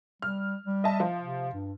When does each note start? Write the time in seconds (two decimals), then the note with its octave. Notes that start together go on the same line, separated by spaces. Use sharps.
0.22 G3 F6
0.67 G3
0.84 D#5 E5 A5
1.00 F3
1.20 C3
1.53 G2